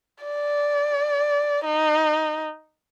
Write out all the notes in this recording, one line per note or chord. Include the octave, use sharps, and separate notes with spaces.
D5
D#4